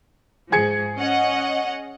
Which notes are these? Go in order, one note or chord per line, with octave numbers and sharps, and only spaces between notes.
G#2 F3 G#4 G#6 C#7
C#4 D#5 F#5